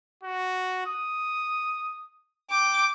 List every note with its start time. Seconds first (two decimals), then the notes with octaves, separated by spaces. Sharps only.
0.23 F#4
0.86 D#6
2.51 G5 D6